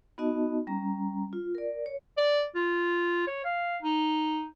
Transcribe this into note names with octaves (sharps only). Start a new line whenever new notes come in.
B3 D#4 F#4 D#5 A5
G3 C#4 A#5
F4
A#4 D5
C#5
D5
F4
C#5
F5
D#4